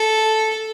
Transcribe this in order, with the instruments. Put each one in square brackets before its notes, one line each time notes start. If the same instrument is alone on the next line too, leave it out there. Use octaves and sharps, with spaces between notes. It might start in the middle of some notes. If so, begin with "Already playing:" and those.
Already playing: [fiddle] A4